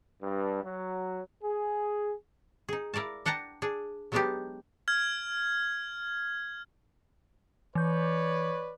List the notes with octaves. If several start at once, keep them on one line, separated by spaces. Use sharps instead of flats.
G2
F#3
G#4
D#4 G#4
E4 A#4 D5 F5 A5
D4 F#5 G5 A5 A#5
D4 G#4
F#3 G#3 B3 D4 D#4 G4
F6 G#6
E3 B4 C#5 D5 G6